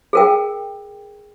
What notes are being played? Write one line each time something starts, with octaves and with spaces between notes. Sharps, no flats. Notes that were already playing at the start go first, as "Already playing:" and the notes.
G#4 A#4 G5